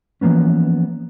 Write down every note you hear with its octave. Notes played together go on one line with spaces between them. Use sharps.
E3 F3 A#3 B3 C#4